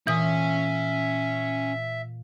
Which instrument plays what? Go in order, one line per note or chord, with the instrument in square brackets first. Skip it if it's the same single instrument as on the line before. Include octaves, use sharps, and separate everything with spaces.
[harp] A#2 [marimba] E3 D#6 [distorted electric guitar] C#4 G#5 [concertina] E5